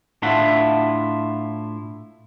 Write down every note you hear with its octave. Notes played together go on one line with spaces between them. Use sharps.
A2 D4 E4 F4 E5 F#5